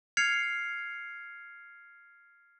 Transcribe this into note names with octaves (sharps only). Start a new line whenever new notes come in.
F6 G#6 C7 C#7 F7